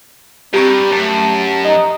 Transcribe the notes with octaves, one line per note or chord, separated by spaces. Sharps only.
G2 C4 G4 A#5 C#6
F#2 A3 A5
D#4 D#5